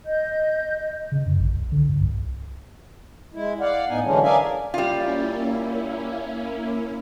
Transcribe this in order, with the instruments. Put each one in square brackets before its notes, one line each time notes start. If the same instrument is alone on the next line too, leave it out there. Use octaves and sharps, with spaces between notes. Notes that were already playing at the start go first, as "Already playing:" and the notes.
[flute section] D#5 G6
[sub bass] C#3
F#2
A1
C2
D3
G2
C2
[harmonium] G#3 E4
D5 F5 F#5
A2 B3 D#4 G#5
D3 E3 F#3 G#3 C#4 D4
G#4 A#4 D5 E5 F5 G#5
[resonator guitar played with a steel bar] G3 F4 [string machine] A#3 C#4 E4